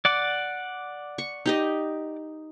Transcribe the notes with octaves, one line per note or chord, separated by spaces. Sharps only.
D5 F#5 D6
C#6
D#4 G4 D#5